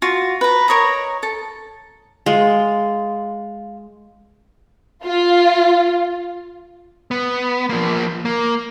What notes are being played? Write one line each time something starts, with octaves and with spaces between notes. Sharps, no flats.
F4 F#4
B4 A#5
A#4 C#5 D#5 A#5
A4
G#3 F4
F4
B3
F3 A#3
A#3